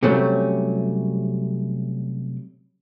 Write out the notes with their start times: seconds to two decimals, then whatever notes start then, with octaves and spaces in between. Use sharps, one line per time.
0.03 C3 F#3 G3 A3 C4 C#4